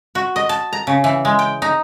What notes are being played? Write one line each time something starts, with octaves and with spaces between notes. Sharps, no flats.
F#4
D#5
A5
A#5
C#3
E3
G#3
G5
D#4